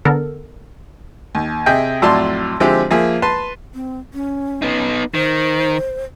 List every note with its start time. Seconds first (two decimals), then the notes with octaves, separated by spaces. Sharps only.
0.05 D3 B3 A4 A#4
1.35 D#2
1.66 C3 G#4 D#5 E5 G5
2.02 F2 A2 F#3 D5 A5 C6
2.60 D3 F3 G#3 C4 E4 G4
2.91 F3 A#3 G#4 E5
3.22 B4 A5 C6
3.74 C4
4.14 C#4
4.62 B3 D#4
5.14 D#3 C5